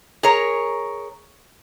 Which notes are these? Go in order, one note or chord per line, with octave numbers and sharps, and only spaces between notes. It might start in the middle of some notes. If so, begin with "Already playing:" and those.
G#4 A#4 C#5